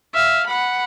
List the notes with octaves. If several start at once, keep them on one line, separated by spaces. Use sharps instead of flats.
E5 F5
F#5 B5